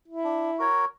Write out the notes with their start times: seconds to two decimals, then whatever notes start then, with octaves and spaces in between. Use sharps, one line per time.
0.08 E4
0.24 D4
0.58 F#4 A#4 C#5